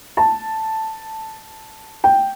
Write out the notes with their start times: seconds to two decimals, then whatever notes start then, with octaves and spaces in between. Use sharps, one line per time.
0.17 A5
2.04 G5